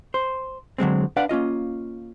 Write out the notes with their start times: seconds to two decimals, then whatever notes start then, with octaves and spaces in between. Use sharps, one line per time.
0.14 C5
0.78 D3 F#3 G#3 C4
1.17 D4 B4 D5 F5 F#5
1.29 A#3 C#4 F4 D#5